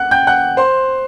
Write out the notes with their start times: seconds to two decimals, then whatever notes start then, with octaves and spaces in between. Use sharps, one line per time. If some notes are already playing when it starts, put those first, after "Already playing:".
Already playing: F#5 F#6
0.11 G5 G6
0.27 F#5 F#6
0.57 C5 C6